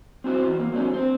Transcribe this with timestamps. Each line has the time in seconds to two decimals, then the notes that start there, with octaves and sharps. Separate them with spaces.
0.24 C4 E4 F#4 C5
0.48 E2
0.60 A#3
0.72 F#3 A3 C4 D4 G4
0.94 C4 C5